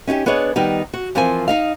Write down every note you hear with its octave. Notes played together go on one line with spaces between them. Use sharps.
C#4 D#4 F#4 G4
B3 D4 G#4 C#5 D#5
D#3 G3 B3 D#4
F#4
E3 F3 C4 F4 A#4 G#5
D#4 D#5 F5